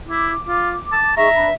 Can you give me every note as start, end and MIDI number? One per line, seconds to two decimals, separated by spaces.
0.08 0.33 64
0.08 1.13 86
0.47 0.75 65
0.92 1.14 81
1.17 1.28 63
1.17 1.28 68
1.17 1.54 76
1.17 1.47 82
1.17 1.28 85
1.35 1.49 62
1.35 1.49 71
1.35 1.49 83